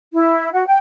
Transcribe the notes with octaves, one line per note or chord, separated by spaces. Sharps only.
E4
F#4
G5